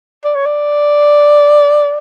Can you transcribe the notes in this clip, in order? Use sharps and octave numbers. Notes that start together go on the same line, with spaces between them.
D5
C#5
D5